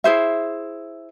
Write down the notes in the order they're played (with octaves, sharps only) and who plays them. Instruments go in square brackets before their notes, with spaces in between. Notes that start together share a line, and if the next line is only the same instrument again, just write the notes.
[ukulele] E4 G#4 C5 E5